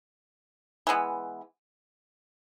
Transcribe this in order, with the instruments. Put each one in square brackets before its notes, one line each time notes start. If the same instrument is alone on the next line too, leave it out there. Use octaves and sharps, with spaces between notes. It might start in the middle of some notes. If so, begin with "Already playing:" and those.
[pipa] E3 G#3 B3